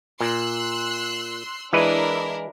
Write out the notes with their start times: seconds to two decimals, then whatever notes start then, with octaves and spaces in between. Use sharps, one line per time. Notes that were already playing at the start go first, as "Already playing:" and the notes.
0.21 A#2 C6 E6 F#6
1.73 E3 G#3 D4 E4 A#4 B4